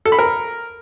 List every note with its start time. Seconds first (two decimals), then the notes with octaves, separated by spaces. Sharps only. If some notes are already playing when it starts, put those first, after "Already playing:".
0.06 A4
0.12 B5
0.19 A#4